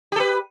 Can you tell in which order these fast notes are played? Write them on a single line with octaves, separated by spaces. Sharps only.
G4 A4 B4